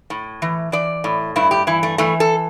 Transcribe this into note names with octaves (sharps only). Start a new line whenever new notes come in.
A2
E3
E3 D5
A2
G2 E4
G4
E3 E4
A3
E3 A3
A4